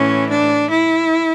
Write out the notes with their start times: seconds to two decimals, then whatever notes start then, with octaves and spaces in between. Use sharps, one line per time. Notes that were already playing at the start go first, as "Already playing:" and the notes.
Already playing: A2 E3 C#4
0.29 D4
0.70 E4